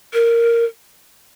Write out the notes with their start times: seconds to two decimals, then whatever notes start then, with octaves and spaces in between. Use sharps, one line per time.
0.14 A#4